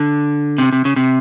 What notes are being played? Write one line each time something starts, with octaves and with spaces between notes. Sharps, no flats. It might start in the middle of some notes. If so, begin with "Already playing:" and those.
Already playing: D3
C3
C3
C#3
C3